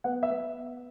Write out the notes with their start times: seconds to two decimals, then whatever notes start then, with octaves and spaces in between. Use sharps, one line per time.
0.04 B3 F#5
0.23 E5
0.30 B3